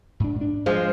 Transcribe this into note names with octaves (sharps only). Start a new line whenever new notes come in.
G#2 D4
D4
F3 G#3